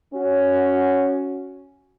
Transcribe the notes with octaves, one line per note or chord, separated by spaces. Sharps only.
C#4 F#4